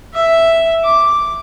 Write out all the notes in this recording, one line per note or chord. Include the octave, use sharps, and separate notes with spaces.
E5
D6